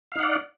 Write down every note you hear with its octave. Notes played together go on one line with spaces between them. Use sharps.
D#4 D5 F5 F#5